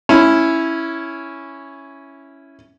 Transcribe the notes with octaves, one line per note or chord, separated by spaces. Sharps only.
C#4 E4